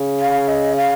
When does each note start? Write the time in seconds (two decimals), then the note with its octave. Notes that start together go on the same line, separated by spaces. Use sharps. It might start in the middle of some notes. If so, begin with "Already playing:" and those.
Already playing: C#3
0.20 F5
0.48 D#5
0.76 F5